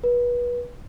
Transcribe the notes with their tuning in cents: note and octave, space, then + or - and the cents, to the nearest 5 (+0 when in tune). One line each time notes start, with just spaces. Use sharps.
B4 -25